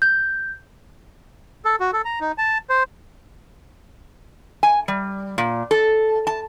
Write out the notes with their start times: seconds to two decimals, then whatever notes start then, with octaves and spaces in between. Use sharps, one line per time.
0.02 G6
1.65 A4
1.80 F#4
1.93 A4
2.05 A#5
2.20 D#4
2.38 A5
2.70 C5
4.63 G#5
4.88 G3
5.38 A#2
5.71 A4
6.27 A5